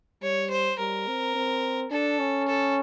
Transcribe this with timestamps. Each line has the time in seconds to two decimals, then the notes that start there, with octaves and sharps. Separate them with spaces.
0.22 G3 C#5
0.51 C5
0.79 G3 A#4
1.07 C4
1.35 C4
1.91 D4 A4
2.19 C#4
2.48 A4